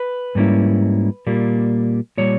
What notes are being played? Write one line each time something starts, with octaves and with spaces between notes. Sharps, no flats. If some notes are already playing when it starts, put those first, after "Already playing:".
Already playing: B4
G#2 G3 A#3 C#4 E4
A#2 G3 A#3
A#2 G3 C#5